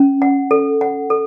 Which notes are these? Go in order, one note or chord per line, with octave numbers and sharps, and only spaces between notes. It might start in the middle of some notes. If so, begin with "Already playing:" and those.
Already playing: C#4
F#5
A4
F#5
A4